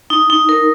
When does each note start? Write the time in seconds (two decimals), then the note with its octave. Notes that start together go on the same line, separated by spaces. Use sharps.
0.10 D#4
0.30 D#4
0.49 A#4